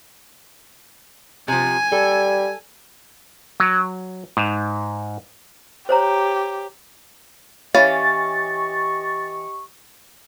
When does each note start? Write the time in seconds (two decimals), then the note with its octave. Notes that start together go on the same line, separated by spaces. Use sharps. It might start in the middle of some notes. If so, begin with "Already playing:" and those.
1.48 C3 F3 G#5
1.92 G3 A4
3.60 F#3
4.37 G#2
5.89 G4 C5 C#5 A#5
7.75 E3 C#4 G4 D#5 F5 C#6 A6